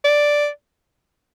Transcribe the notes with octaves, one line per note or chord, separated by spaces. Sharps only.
D5